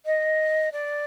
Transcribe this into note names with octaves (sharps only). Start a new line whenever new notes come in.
D#5
D5